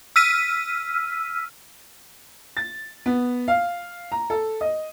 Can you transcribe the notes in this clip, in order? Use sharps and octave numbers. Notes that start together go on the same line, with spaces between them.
E6 F6 B6 D#7
A6
B3
F5
A#5
A4
D#5